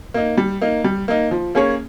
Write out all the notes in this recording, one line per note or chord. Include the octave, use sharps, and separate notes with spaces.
A#3 D#4
G3
A#3 D#4
G3
A#3 D#4
F3
A#3 C#4 G#4 C#5